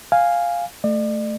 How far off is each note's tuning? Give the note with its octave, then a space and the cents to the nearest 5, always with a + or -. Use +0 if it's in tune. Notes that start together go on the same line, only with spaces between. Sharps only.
F5 +0 G#5 -10
A3 +0 D5 +40